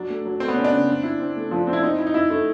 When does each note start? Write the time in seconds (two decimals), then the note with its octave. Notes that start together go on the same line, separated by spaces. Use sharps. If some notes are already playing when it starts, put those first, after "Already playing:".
Already playing: F#3 D4
0.10 A3
0.25 F#3
0.40 A3 C4
0.48 B3
0.55 C4 C#4
0.64 D4
0.72 C#3
0.87 C4
1.04 E4
1.20 C4
1.36 A3
1.51 F3
1.67 C4
1.73 E4
1.83 C4 D#4
1.99 E4
2.07 D#4
2.14 E4
2.30 A3 E4